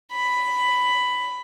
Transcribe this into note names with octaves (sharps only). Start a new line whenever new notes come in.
B5